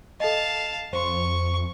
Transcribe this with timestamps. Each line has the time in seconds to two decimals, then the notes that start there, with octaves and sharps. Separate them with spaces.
0.20 A4 D#5 F5 A5
0.93 F2 C5 C6 C#6